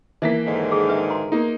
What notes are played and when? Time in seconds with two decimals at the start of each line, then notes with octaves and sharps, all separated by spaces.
0.22 E3 A#3 D#4 E5 B6
0.46 G#2 D3 D#3
0.72 G#4
0.89 D4 B4 E5
1.10 F#4 A#5 C6
1.32 A#3 D#4